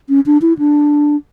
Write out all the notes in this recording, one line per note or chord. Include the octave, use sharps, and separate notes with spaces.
C#4
D4
E4
D4